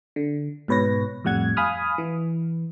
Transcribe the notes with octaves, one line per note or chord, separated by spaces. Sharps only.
D3
G#2 B2 B4 C#5 A#6
F2 A2 G3 F#5 G#6
F5 G#5 B5 D#6 F6
E3